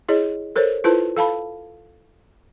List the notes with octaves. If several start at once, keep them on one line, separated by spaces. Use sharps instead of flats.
E4 G#4 C#5 D#5
A4 A#4 C5 C#5
E4 F4 A4 B4 C5 A5
A4 F5 A5 B5